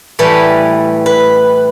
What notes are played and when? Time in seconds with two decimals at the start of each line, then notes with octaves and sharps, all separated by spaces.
0.19 A2 E3 G3 B4
1.06 B4